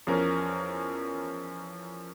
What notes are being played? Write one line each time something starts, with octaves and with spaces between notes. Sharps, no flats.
E2 F3 C#4 A#4